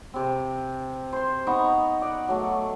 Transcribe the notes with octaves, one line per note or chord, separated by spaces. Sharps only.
C3 C4
C5 C6
B3 D#4 A#5 C#6
D5 F#5
F#3 A3